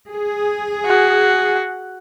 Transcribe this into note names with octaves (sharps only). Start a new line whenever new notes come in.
G#4
F#4